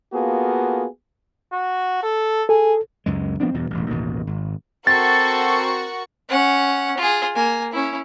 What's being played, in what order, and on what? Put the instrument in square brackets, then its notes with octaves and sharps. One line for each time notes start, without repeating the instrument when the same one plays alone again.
[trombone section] A#3 B3 F4 F#4 G#4 A4
[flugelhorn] F#4
A4
[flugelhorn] G#4 [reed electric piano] A4
[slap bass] C#2 F#2 G#3
F3 B3 C4 D4
E2 G2 B2
E1 A1
A1 D#2 B2 D#3
G#1
[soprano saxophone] C4 [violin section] F#4 A#4 C#6 [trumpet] A4 [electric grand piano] A6
[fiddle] C#4 F#5
F4 G#4
A#3 G#5
C#4 E4